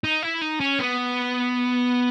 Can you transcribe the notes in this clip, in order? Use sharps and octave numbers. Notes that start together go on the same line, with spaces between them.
D#4
E4
D#4
C#4
B3